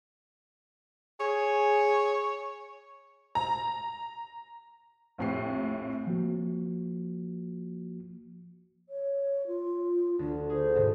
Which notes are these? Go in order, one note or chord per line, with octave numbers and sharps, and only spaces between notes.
G#4 C#5
A#5
A#1 F2 A2 G4 C7
F3 A#3 F#4
C#5
F4
D2 D3 D4
G#4 C5
G#2 B2 D3